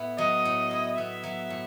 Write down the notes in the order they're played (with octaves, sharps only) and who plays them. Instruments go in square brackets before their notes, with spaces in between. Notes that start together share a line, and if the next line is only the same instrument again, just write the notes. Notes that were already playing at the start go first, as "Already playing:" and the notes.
Already playing: [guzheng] A2 B3 E4
[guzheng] F#3 [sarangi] D#5
[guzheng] A2
E4
[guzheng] B3 [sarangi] E5
[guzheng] F#3
A2